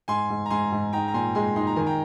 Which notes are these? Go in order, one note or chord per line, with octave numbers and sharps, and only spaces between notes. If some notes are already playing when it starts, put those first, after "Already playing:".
G#2 G#5 C6
G#2
A#5
G#2 G#5 C6
G#2
D#4 G5 A#5
A#5
A#2 G#5 C6
G#3 G#5 C6
D#4 C6
A#5
D#3 G#5
G5 A#5